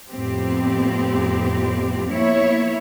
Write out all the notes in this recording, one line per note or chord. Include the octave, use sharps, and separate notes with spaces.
F2 A2 B3 C4 G4
F3 A#3 B3 E4 C#5 E5